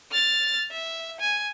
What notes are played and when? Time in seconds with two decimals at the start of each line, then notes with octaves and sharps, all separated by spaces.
0.12 F6 A6
0.72 E5
1.20 G#5